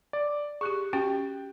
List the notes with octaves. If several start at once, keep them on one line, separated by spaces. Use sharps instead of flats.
D5
G4 G#4 C#6 F#6
C#4 F#4 G4 G5